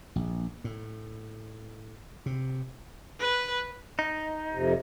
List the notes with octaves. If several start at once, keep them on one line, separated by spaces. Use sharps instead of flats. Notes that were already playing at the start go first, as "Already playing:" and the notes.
A#1
A2
C3
B4
D#4
F2 C3